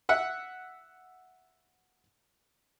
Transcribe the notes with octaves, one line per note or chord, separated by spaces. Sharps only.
E5 F#5